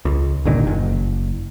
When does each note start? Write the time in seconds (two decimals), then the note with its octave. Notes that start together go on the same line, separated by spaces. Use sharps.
0.05 C#2
0.45 G1 G2 A#2 D#3
0.67 F#1